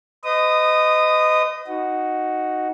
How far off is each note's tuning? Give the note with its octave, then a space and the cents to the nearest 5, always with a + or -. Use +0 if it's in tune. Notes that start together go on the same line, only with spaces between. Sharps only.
B4 +45 D#5 +0 D#6 -10
D#4 +0 F#4 +0